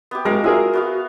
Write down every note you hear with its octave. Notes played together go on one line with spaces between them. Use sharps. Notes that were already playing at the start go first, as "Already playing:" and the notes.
B3 G4
G#3 F#4 A#4 F5
F4 G#4 A#4 E5
B3 F#4 F5